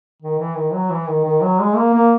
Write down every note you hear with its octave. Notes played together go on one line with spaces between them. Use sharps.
D#3
E3
D#3
F#3
E3
D#3
D#3
F#3
G#3
A#3
A#3